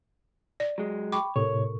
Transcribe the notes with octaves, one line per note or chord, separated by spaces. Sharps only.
D5
F#3 G#3
G5 B5 C#6 D6
A2 C3 A4 A#4 C#5 C#6